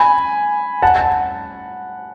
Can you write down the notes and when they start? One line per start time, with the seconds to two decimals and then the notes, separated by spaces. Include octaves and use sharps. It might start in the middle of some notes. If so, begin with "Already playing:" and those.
Already playing: G#5 B5
0.82 F#5 A5
0.96 A5